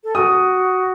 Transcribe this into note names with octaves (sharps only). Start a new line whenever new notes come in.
A4
F#4 D#6